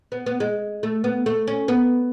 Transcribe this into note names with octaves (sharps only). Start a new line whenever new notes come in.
B3
B3
G#3
A3
B3
A3
C#4
B3